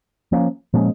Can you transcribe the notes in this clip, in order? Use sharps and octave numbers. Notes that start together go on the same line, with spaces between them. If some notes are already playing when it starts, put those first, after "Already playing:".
F3 A#3 C#4
A#2 F3 G#3 C#4